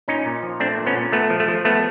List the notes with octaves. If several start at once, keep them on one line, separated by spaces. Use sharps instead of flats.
A#2 C#4 D#4
A#2
F3
A3 C4 D4
A#2
B3 C#4
A#2
A3 B3
F3
A3
F3
A3 B3